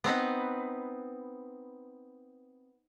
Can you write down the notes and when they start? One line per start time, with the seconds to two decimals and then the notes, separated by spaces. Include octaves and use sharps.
0.04 B3 C4 D#4 B4